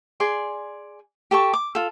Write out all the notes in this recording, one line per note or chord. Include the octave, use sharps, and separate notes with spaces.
G#4 D5 C6
G4 A4 A5 C#6
D6
F4 A4